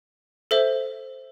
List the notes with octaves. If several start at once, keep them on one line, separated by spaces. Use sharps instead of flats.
A4 C5 E5